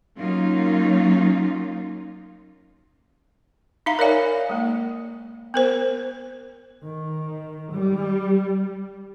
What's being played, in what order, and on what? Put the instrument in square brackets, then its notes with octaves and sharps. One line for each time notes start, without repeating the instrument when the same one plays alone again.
[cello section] F#3 A#3 C#4 D#4 F4
[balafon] D#4 E5 F5 A#5
A#4 C#5 D5 F5 G#5
G#3 A#3
B3 A#4 C5
[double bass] D#3
G3